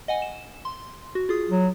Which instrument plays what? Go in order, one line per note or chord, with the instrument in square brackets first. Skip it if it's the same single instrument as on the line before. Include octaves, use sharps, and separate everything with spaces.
[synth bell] D#5 F#5 G#5
E7
C6
F#4
F4 G#4 D#6
[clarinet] F#3